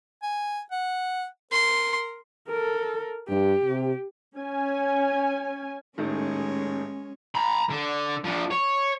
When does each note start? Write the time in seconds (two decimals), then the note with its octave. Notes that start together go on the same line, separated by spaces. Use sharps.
0.23 G#5
0.71 F#5
1.52 A#4 C6
2.48 A4 A#4
3.29 G2 G4
3.64 C3
4.35 C#4 G#5
5.98 D#1 A2 D#3 G#3 C#4 C#5
7.35 A#5 B5
7.70 D3
8.24 F3 D4
8.50 C#5